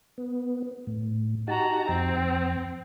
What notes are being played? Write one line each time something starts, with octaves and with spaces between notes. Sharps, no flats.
B3
A2
D#4 F#4 G4 A5 A#5
F2 C4